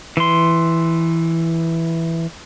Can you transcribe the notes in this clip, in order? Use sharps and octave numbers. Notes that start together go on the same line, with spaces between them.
E3 C6